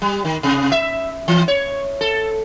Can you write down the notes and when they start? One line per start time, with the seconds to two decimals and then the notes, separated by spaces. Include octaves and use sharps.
0.02 G3
0.25 D#3
0.43 C3
0.72 E5
1.28 E3
1.48 C#5
2.01 A4